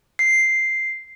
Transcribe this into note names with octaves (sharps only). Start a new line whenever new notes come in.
C7